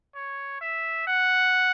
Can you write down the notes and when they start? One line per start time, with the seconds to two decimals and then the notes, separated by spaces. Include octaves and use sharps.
0.15 C#5
0.61 E5
1.07 F#5